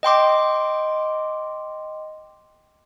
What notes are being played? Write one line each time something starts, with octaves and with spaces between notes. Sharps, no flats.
D#5 G5 C6 D6